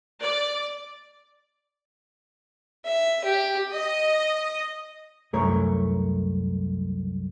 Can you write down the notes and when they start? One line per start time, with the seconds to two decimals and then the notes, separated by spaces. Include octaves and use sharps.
0.21 D5
2.85 E5
3.24 G4
3.73 D#5
5.33 C2 F#2 A3 A#4 C#5